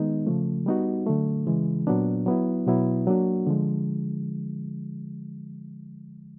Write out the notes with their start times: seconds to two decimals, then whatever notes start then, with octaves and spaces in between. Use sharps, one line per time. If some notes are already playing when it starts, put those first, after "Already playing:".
Already playing: D#3 G#3 B3 D#4
0.27 C#3 F3 A3
0.66 G3 B3 D#4 F#4
1.07 D3 F#3 A3
1.47 C#3 E3 G#3
1.87 A#2 F#3 B3 D4
2.26 F#3 B3 E4
2.66 B2 F#3 B3 E4
3.07 F#3 A#3 D4 F#4
3.47 D3 F3 G#3